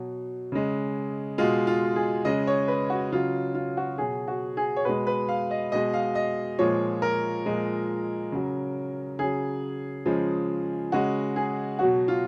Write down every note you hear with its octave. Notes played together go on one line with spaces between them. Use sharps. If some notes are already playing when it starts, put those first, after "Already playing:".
Already playing: B2 F#3
C#3 G#3
B2 G#3 F4
F4
G#4
C#3 G#3 D#5
C#5
B4
F#4
C#3 F#3 F4
F4
F#4
B2 F#3 G#4
F#4
G#4
C#5
B2 G#3 B4
B4
F5
D#5
B2 G#3 D#5
F5
D#5
A#2 F3 G#3 C#5
A#4
A#2 F3 G#3
C#3 F#3
C#3 F#3 G#4
C#3 F3 G#3
C#3 G#3 F#4
G#4
B2 F#3 F#4
F4